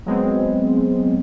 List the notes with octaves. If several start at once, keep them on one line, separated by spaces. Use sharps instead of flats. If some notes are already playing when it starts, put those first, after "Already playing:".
F#3 G#3 B3 C4